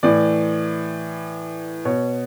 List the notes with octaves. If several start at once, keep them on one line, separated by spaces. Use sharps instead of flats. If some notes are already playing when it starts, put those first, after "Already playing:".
A2 E3 D5
B2 C#5